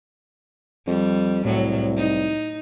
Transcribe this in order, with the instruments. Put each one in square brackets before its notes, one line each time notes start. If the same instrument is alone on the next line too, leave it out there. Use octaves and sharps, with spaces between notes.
[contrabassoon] F2 [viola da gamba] G3
[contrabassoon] C2 [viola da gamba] A2 F#3
[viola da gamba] D#4